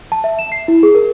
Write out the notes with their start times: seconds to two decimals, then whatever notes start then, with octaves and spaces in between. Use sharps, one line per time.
0.12 A5
0.24 E5
0.39 E7
0.52 C7
0.68 E4
0.83 G#4
0.95 A#4